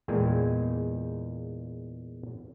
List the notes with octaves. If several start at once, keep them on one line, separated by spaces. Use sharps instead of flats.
E2 A#2 G#3 G5 G#5